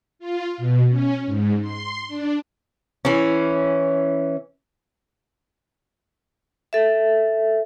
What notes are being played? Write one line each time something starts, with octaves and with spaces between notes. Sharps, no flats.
F4
B2
C#4
G#2
C6
D4
E3 C#4
A4 E5